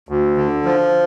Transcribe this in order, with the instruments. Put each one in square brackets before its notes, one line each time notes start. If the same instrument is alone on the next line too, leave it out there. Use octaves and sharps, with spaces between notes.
[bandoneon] D2
D3
F3